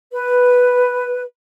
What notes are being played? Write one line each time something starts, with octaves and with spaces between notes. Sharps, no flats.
B4